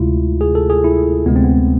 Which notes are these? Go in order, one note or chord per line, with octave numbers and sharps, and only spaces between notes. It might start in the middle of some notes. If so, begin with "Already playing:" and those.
Already playing: D2 C3 G#3 E4 F4
G#4
A4
G#4
E4
D2 C3 G#3 B3
C4
B3